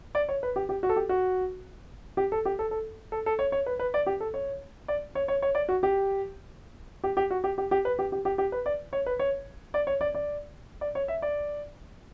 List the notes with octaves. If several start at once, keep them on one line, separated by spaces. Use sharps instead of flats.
D5
C#5
B4
G4
G4
F#4
A4
G4
F#4
G4
A4
G4
A4
A4
A4
A4
C#5
C#5
B4
B4
D5
G4
A4
C#5
D5
C#5
C#5
C#5
D5
F#4
G4
G4
G4
F#4
G4
G4
G4
B4
G4
G4
G4
G4
B4
D5
C#5
B4
C#5
D5
C#5
D5
D5
D5
C#5
E5
D5